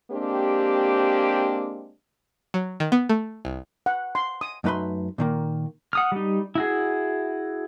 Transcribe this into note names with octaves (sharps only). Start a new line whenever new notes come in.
G#3 A#3 C4 D4 G4
F#3
D#3
B3
A3
C2
F#5
C6
D#6
F#2 A3 D#4 B4 B5 C6
A#2 D#3 A#3
F#5 D#6 F6
G3 D#4
E4 F#4 G#4